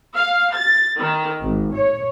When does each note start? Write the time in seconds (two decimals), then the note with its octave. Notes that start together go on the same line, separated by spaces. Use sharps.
0.15 F5
0.52 A6
0.98 D#3
1.44 G#1
1.75 C#5